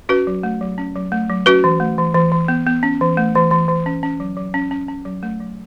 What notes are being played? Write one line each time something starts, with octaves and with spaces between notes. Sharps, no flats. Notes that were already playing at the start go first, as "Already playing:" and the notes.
C#4 F#4 B4
F#3
A3
F#3
C#4
F#3
A3
F#3
C#4 F#4 B4
E3
A3
E3
E3
E3
B3
B3
C#4
E3
A3
E3
E3
E3
C#4
C#4
F#3
F#3
C#4
C#4
C#4
F#3
A3
F#3